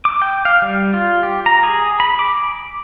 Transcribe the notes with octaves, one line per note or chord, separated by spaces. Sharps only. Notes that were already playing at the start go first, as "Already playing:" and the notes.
D6
G5
F5
G3
F4
G4
A#5
G#4
B5
D6